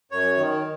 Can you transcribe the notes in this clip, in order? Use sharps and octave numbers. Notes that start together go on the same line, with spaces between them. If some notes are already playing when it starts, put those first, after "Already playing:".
F#2 C#5
D#3